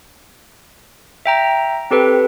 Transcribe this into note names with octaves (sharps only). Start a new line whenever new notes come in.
E5 G5 A#5
C4 G4 A4 B4